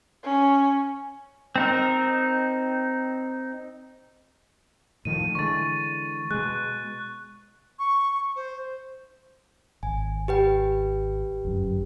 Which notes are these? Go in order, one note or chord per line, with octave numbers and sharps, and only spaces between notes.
C#4
C4 D#4 A#4
A2 D#3 F3 D#7
D3 E3 G#3 C#6 A6
B2 G#3 F#6
C#6
C5
G#1 G#5
G4 B4 G5
G1 F#2